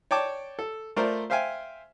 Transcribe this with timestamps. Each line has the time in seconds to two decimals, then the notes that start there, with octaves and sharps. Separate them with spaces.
0.11 C#5 D5 G5 A5 D6
0.59 A4
0.96 A3 F4 A#4 C5 D5
1.30 C5 E5 F5 G5 G#5